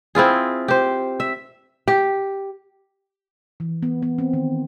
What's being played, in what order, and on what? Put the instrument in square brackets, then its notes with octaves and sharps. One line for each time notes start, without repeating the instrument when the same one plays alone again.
[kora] C4 E4 F4 G#4
G4 C5
E5
G4
[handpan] E3
B3
B3
C4
D#3